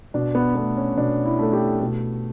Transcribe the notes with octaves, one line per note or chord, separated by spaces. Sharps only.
B2 D4
B3
A3 B3
C#4
B2 D4
E4
A3 A4
G4
B2 A4